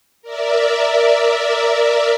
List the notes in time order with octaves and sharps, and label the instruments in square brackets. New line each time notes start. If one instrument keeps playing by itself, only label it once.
[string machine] A#4 D5 E5